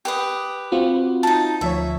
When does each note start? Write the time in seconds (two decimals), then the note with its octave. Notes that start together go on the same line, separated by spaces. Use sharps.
0.05 G4 B4 D#6
0.72 C4 F4 F#4
1.23 D#4 A5
1.61 D2 F3 C#5 E5